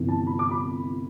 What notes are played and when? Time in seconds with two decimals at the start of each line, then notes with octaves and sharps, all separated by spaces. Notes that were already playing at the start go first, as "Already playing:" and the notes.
Already playing: G1 F2 C3 E3
0.08 A5
0.27 B5
0.39 D6
0.51 B5